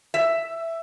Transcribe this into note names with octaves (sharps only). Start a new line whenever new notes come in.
E5